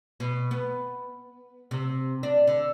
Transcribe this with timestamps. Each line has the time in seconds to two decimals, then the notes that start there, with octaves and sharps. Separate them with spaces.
0.20 B2
0.51 B3
1.71 C3
2.23 D4
2.47 D3